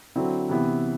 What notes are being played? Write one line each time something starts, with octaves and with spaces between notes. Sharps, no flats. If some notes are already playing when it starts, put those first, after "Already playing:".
D3 F#3 C4 E4
C3 E3 B3 E4